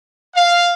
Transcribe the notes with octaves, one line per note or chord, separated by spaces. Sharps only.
F5